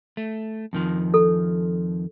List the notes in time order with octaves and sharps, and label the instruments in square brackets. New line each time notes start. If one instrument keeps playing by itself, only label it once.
[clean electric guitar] A3
F2 D#3 F3
[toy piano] A4